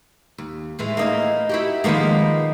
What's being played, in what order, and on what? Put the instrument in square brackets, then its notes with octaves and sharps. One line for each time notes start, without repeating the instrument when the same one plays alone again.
[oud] D#2
A2 E3 G#3
[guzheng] A#3 D#4 A#4
[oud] E4 F#4 G4
[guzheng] D#3 A#3 B3 [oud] F3 G#3